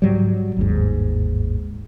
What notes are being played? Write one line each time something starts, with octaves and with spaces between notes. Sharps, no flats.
G#2 F#3 G3
G1 D#2 G#2